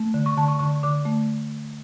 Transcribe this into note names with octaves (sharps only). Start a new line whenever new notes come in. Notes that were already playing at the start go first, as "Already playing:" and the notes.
Already playing: A3
D3
C#6
D3 A5
C#6
D3 C#6
D3 D6
A3